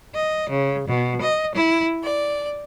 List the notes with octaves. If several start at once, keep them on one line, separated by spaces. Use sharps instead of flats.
D#5
C#3
B2
D#5
E4
D5